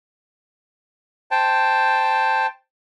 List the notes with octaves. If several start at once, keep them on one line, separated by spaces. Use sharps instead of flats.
C5 G5 A5